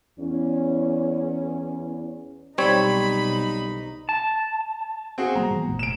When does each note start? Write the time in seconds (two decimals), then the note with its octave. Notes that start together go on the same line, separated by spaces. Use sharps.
0.19 E2 C#4
2.58 B1 G3 C4 D#4 C#5 B5
4.09 A5
5.18 C4 F#4 G#4
5.35 G3 A#3 A#5
5.50 A2 E3 B3
5.68 F1 A#2 A3
5.79 D7 E7